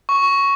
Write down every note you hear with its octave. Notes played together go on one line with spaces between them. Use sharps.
C#6